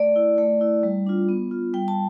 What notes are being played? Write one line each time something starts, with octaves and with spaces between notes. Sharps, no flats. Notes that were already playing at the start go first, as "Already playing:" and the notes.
Already playing: A3 D5
E4
A3
E4
G3
D4 F4
B3
F4
G3 G5
A5